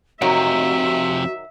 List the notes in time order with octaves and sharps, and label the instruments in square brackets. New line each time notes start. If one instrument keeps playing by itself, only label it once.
[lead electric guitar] F2 C3 [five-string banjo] D#3 F#3 [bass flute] F#4 [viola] E5